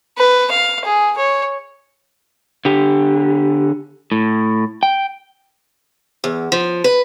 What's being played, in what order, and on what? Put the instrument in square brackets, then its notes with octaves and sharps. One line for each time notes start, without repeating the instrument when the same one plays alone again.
[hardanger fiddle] B4
F5
G#4
C#5
[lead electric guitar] D3 G4
A2
G5
[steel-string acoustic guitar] E2
F3
B4